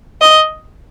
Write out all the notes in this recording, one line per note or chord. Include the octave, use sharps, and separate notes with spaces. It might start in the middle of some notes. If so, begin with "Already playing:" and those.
D#5